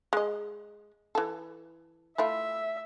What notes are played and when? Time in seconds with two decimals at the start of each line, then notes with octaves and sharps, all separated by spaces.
0.13 G#3 D#5
1.15 E3 A4
2.18 A3 E4 F4 E5